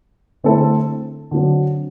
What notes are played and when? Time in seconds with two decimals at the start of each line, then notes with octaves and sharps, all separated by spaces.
0.44 D3 A3 C4 E4 A4
1.31 D3 F#3 C4